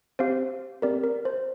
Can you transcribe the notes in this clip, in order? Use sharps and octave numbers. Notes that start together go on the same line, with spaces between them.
C4 G4 C5 F5
C4 G4 A#4 D5
A#4
C5